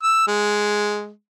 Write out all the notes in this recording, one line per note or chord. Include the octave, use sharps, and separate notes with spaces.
E6
G#3